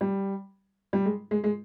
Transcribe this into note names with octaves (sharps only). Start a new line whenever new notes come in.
G3
G3
G#3
G#3
G#3